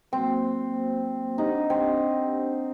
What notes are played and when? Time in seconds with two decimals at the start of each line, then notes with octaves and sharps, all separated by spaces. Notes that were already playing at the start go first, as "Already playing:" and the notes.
0.12 F#3 A#3 C4 F#4 C5
1.38 D4 D#4 G4 C5 F#5
1.70 C4